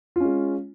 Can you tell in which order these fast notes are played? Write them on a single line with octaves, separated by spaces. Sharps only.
F4 C#4 G#3